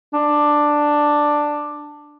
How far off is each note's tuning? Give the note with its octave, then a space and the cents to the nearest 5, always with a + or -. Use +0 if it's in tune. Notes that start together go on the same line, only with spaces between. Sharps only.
D4 +5